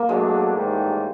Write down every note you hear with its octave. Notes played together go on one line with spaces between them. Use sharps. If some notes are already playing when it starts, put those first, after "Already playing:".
Already playing: A#3
B2 F#3 G#3 A3 D4
A1 G#2 D#3 G3